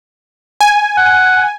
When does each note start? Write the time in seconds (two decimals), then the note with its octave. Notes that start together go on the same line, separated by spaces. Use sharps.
0.61 G#5
0.97 F#5